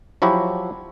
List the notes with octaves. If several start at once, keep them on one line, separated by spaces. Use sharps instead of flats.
F3 F#3 E4 F#4 G4